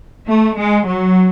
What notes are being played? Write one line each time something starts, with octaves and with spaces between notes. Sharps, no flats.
A3
G#3
F#3